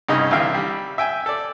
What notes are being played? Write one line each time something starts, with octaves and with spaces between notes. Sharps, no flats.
C2 G2 C#3 D#4 D#5
C2 D3 E3 E5 F5 G5
G3
E5 G5 G#5
A4 D5